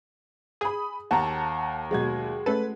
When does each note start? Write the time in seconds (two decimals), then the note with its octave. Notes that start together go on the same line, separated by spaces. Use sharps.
0.61 G#4 B5 D#6
1.11 D#2 F#5 A5 A#5
1.91 B2 F#3 G#3 F#4 G#6
2.46 A3 C#4 A4 B4